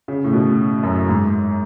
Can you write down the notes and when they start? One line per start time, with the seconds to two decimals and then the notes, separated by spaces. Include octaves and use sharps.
0.08 C#3
0.24 A2
0.33 B2
0.83 F#2
1.09 G#2